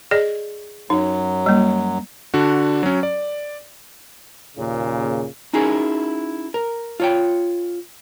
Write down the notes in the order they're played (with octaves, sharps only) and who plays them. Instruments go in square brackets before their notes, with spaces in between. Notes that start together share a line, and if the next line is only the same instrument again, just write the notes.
[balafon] G#4 D5 D#5
[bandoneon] F#2 F#3 [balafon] D#4
[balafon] G3 A#3
[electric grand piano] D3 D4 F#4
F#3 C#4
D5
[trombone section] D#2 A#2 C#3
[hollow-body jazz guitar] C#4 D#4 E4 F#4 G#4 A#4
A#4
F4 C#5 G5